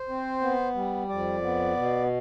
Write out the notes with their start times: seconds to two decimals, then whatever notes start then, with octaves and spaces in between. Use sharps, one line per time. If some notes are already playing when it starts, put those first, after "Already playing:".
Already playing: C5
0.09 C4
0.41 B3
0.75 G3
1.09 F2 D5
1.43 B3
1.76 B2